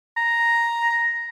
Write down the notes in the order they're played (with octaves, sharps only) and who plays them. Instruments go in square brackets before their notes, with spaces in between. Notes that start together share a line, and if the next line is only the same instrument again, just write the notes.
[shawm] A#5